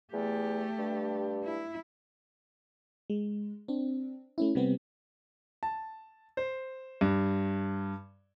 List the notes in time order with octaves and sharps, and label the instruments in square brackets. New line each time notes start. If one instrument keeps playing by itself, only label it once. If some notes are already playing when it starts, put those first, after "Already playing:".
[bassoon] E2 [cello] A3 G4
[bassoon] G2
[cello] E4
[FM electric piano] G#3
C4 D4
A3 C#4 E4
C3 G3 B3 C4
[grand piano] A5
C5
G2